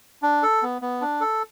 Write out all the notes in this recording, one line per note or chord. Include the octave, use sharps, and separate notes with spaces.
D4
A4
B3
B3
D4
A4